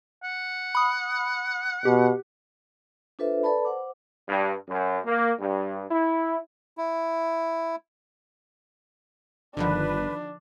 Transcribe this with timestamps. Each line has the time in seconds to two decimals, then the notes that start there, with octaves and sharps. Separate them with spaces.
0.24 F#5
0.75 B5 D#6
1.85 B2 G4
3.19 D4 F4 A4 B4 C5 E5
3.43 A4 B4 D5 A5 B5
3.65 C5 F#5 D6
4.28 G2
4.68 F#2
5.05 A#3
5.40 G2
5.90 E4
6.78 E4
9.57 G1 D3 D#3 F3 D4 B4